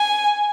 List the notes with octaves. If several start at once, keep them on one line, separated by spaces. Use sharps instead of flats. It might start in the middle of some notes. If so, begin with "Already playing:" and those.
Already playing: G#5